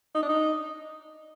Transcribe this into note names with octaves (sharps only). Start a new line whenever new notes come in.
D#4
D4
D#4